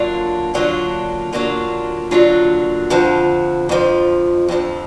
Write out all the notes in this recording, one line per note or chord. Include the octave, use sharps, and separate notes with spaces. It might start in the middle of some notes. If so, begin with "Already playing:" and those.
Already playing: D3 F#3 A#3 D4 F4
D3 F#3 A#3 D4 F4
D3 F#3 A#3 D4 F4
D3 F#3 A#3 D4 F4
F2 D3 F3
F2 D3 F3
F2 D3 F3